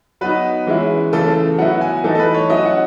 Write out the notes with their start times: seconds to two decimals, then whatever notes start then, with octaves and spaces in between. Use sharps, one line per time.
0.21 F#3 B3 D#4 B4
0.67 E3 G#3 C#4 E4
1.13 C#3 E3 A3 A4
1.28 A4
1.58 F#3 B3 E4 F#5
1.81 G#5
2.04 E3 A3 D#4 A4
2.15 A4
2.19 B4
2.34 C#5
2.50 F#3 C#4 E4 D#5
2.65 F#5